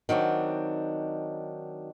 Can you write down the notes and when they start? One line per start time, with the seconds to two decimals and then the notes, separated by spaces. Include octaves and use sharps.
0.09 D#3 F#3 C4 D4